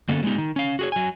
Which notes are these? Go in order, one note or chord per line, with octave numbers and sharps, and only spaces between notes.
D3 A#3 B3 C#4 A4
F#3 G#3 B3 D#4 G4
D#3 D#4
C#4 F5
F#4 G#4 C#5
F#3 G#5